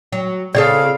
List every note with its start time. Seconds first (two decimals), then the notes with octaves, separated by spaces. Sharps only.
0.12 F#3
0.55 C#3 C4 F4 G#4 A4 D5 F5